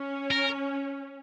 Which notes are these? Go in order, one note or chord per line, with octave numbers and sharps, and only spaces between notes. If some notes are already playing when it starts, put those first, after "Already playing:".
Already playing: C#4
A#4